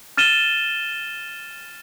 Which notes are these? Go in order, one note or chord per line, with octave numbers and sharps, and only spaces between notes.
F6 A6 D#7 E7 G7